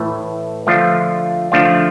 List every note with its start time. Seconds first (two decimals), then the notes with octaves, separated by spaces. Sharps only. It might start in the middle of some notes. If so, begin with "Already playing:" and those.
Already playing: A2 E3 A3
0.67 D3 F3 A3 D4 F4
1.52 D3 F3 A3 D4 F4